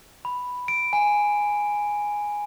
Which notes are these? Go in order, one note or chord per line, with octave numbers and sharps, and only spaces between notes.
B5
D7
G#5